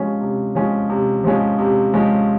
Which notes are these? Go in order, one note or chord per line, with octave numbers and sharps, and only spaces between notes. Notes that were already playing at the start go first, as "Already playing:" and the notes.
Already playing: C3 F3 G#3 C#4
C3
F3 G#3 C#4
C3
F3 G#3 C#4
C3
F3 G#3 C#4